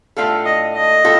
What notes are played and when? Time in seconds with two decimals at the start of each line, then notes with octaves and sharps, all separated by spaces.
0.17 A2 A3 D4 F4 A4 F5
0.46 D#5
0.75 D#5
1.04 A2 F4 A4